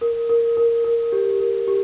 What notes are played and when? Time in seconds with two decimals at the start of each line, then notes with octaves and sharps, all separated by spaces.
0.01 A#4
0.29 A#4
0.57 A#4
0.84 A#4
1.12 G4
1.40 A#4
1.68 G4